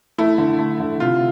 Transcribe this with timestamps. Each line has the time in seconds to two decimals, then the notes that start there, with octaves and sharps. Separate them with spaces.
0.18 A3 E4
0.38 D3
0.59 A3
0.80 D3
1.00 C3 F4